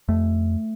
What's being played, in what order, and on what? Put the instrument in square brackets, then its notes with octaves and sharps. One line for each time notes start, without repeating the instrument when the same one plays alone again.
[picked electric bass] F2 A3